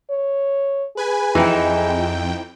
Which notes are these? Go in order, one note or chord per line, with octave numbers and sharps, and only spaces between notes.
C#5
G#4 B4 G#5
F2 E3 D#4 E4 G5